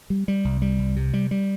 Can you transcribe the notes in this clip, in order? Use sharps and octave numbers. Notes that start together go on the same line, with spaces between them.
G3
G3
C2
G3
C2
C3
G3
G3